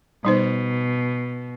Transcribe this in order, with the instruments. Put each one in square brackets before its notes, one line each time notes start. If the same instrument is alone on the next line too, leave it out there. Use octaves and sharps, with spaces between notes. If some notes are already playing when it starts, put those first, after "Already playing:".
[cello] B2 [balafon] G3 D#4 C5